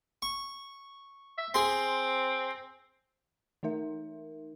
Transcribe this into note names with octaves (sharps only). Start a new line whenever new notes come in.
C#6
E5
C4 G#4 C6
E3 A3 D#4 A#4 E5